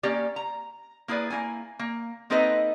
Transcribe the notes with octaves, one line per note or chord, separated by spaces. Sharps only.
A#3 C#4 G4 D5
A#5
A#3 E4 G#4 B4 D5
A#3 C#4 E4 G#5
A#3
A#3 C4 D#4 A4 B4 D#5